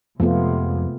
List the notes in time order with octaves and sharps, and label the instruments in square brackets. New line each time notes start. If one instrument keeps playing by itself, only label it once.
[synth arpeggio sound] F2 [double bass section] C3 G#3 [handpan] A3 B3 F4